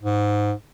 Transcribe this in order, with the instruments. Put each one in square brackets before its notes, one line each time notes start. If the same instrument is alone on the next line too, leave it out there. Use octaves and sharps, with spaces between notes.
[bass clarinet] G#2